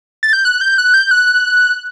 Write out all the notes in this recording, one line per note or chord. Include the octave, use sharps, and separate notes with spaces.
A6
G6
F#6
G6
F#6
G6
F#6